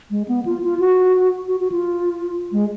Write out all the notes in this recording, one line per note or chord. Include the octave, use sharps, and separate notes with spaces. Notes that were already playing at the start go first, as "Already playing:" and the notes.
G#3
B3
F4
F4
F#4
F#4
F#4
F4
G#3